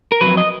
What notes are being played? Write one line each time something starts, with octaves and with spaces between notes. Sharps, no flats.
A#4
F2 C#3 F#3 B4
D#5